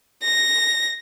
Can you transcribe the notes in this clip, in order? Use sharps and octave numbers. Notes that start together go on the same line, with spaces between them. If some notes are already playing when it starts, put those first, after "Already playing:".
A#6